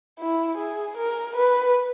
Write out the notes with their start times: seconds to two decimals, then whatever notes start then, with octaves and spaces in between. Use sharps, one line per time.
0.20 E4
0.57 G#4
0.97 A#4
1.36 B4